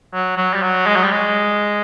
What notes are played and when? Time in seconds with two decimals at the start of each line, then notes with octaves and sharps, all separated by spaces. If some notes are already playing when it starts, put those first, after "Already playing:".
0.13 F#3
0.37 F#3
0.54 G3
0.63 F#3
0.87 G#3
0.96 F#3
1.04 G3
1.12 G#3